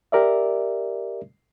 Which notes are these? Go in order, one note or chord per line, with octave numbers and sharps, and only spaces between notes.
G4 A#4 D5 E5